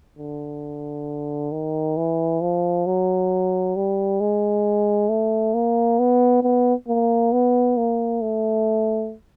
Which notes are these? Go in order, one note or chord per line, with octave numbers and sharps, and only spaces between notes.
D3
D#3
E3
F3
F#3
G3
G#3
A3
A#3
B3
B3
A#3
B3
A#3
A3